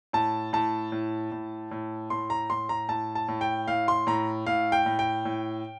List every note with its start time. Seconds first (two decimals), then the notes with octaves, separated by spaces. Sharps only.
0.13 A2 A5
0.53 A2 A5
0.92 A2
1.32 A2
1.71 A2
2.10 A2 C6
2.30 A#5
2.50 A2 C6
2.69 A#5
2.89 A2 A5
3.15 A5
3.28 A2
3.41 G5
3.68 A2 F5
3.88 C6
4.07 A2 A#5
4.46 A2 F5
4.72 G5
4.86 A2
4.99 G5
5.25 A2